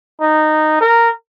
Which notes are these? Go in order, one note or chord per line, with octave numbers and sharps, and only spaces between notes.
D#4
A#4